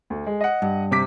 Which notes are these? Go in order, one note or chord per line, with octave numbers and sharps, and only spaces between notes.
D2
G#3
D#5 F#5
G2
C3 D6 B6